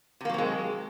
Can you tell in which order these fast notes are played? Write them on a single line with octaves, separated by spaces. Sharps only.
C3 A#3 F#3 C4 G#3